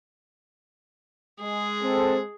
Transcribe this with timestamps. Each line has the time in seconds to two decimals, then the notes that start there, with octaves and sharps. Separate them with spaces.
1.41 G#3 G#4
1.82 C4 A4